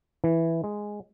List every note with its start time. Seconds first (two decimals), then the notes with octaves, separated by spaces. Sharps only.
0.24 E3
0.64 G#3